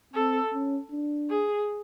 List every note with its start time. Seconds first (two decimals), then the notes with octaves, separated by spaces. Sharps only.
0.14 C4 A4
0.53 C#4
0.92 D4
1.30 G#4